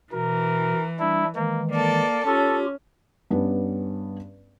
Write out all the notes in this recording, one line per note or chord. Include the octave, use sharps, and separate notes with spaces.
B2 E3 A#4
G3 D4 E4
D#3 E3 G#3 A#3
A#3 A4 D5
C#4 F4 G4 A4
G2 B3 C#4 D4